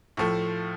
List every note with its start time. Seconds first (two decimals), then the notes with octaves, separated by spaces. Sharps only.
0.17 A2 F3 A3